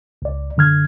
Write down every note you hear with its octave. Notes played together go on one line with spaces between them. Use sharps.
C#2 D5
F#2 D3 F6 G#6